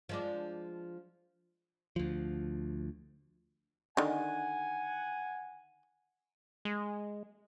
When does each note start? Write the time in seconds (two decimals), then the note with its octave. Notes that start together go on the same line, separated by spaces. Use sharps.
0.09 F3 G#3 D4
1.96 D2 F3
3.97 D3 D#3 F#5 G#5
6.65 G#3